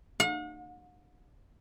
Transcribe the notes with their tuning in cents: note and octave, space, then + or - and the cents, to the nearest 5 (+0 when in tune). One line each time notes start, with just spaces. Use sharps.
F#5 -45